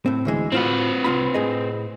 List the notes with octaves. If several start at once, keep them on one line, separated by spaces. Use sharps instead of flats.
A2 C4
D2 E3 G#3
A2 C4 F4 F#4 B4
C2 F4 B5
A2 G#4 D#5